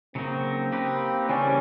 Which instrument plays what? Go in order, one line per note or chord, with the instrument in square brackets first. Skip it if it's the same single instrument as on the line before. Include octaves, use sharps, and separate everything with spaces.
[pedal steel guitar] C#3 F#3 A#3 D#4 [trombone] C4
[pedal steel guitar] A#3 D#4 G4 B4
[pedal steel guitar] C#3 E3 G3 A#3 D4 [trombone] C#4